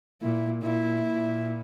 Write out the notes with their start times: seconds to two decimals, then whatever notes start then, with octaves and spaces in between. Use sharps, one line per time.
0.22 A#2 E4
0.62 A#2 E4
1.02 A#2